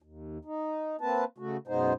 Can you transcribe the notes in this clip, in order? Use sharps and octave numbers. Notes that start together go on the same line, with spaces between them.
D#2
D#4
A#3 C4 B4 A5
C#3 A3 F#4
F#2 B2 G#3 B3 D#4 C5